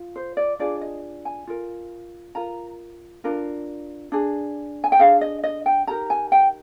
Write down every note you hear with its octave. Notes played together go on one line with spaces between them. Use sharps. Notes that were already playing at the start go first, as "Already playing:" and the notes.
Already playing: F4
C5
D5
D4 F4 G#4 D5
D#5
G#5
F4 A#4
F4 A#4 A#5
D4 F4 A#4
D4 G#4
G#5
G5
D4 G#4 F5
D#5
D#5
G5
D#4 G4 A#4 A#5
G#5
G5